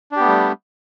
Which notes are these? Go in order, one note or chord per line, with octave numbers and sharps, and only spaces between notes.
G3 A3 B3 D4 G4